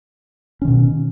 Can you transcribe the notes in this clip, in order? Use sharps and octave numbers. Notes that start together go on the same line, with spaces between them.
B2 D#3 C#4